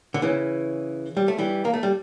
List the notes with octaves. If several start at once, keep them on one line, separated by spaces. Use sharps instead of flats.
D3
C#3 E3
G3
A3
E3 G3
A#3
A3
G3